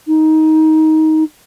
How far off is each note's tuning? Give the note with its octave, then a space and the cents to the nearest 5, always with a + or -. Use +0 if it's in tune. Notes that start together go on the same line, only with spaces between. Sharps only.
D#4 +15